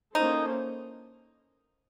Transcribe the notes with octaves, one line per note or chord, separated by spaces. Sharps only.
A#3 C#4 D#4 E4 A4 C5